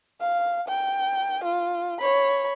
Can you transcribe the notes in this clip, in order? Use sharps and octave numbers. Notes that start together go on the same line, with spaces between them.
F5
G5
F4
C#5 B5